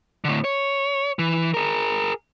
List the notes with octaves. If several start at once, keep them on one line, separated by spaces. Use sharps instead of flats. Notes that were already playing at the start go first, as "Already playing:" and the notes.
A2 D3
C#5
E3
G#4 A#4